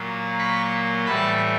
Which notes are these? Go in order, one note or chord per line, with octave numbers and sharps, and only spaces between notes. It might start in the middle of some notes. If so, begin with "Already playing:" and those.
Already playing: A#2 F#3 A#3
B5 C#6
A2 E3 G3 A5 B5